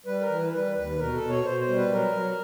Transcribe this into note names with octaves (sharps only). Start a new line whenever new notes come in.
G3 B4
A#4
E3
B4
G3 B4
D#2 B4
B2 A#4
A4
B2
C#5
B2 C5
C5
G3
B4
F#3 A#4
F#3